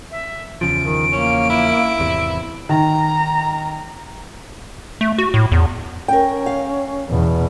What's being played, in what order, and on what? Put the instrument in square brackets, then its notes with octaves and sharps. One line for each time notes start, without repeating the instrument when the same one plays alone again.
[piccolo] E5
[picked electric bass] E2 C#3 F3 [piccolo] D7
[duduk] D#3
[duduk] A#3 [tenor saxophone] C#4
[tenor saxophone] E4
[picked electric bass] G#1 E2 C3
[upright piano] D#3 [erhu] A#5
[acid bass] A3
F#4
A2
E2
[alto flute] C#4 [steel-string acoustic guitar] A#4 G5
[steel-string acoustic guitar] F5
[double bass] E2 B2